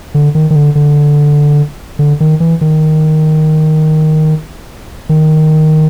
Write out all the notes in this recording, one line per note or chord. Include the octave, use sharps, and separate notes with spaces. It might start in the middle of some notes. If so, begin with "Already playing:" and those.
D3
D#3
D#3
D3
D3
D3
D#3
E3
D#3
D#3